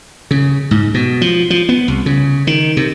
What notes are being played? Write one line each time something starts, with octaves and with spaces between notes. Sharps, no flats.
C#3
G#2
B2
F3
F3
B3
C2
C#3
D#3
C3